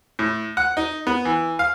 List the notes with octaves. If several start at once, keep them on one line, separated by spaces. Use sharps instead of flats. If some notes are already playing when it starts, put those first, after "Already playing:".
A2
F#5
D#4
B3
E3
F5